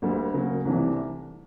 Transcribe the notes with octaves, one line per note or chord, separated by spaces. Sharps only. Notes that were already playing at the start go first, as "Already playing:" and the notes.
D2 D3 G3 A#3
C#3 F#3 A#3
C2 C3 E3 A3 D4